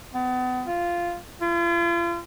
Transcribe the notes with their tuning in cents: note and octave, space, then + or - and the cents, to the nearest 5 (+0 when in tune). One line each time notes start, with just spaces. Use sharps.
B3 +35
F4 -10
F4 -40